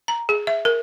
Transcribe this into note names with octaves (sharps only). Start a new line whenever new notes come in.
A#5
G#4
E5
A#4